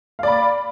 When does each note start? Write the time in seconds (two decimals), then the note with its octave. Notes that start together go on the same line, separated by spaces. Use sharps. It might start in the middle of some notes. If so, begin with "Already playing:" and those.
0.19 F5
0.23 D5
0.28 B5